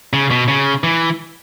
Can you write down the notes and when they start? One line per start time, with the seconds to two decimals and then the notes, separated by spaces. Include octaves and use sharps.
0.13 C#3
0.31 B2
0.48 C#3
0.84 E3